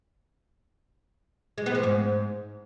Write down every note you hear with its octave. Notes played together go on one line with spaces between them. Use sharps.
G#3
B3
F3
G#2